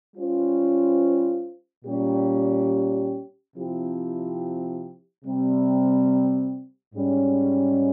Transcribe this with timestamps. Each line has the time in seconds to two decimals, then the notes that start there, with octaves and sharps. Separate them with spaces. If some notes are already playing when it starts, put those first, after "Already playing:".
0.16 G3 C#4 F4 C5
1.85 A#2 G3 C#4 G4
3.55 C3 F3 C4 E4 G4
5.25 C3 G3 C4
6.95 G#2 G3 C#4